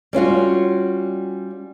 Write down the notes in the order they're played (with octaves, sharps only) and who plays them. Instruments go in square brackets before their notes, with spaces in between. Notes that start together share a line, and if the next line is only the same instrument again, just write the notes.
[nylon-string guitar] G3 C#4 F4 F#4